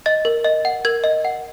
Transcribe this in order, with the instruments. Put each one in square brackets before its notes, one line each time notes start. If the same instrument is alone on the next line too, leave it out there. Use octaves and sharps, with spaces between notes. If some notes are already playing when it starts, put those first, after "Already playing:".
[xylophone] D#5 A6
A#4
D#5
F#5
A#4 G#6
D#5
F#5